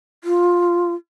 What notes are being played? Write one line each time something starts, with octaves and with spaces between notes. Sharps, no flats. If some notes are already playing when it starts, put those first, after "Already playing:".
F4